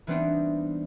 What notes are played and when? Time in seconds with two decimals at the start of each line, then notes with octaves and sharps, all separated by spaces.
0.07 E3 G3 B3 C4 D4 D#4